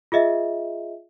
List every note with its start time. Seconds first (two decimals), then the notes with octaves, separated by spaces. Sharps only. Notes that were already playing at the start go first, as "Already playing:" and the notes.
0.12 F4 G#4 D#5 E5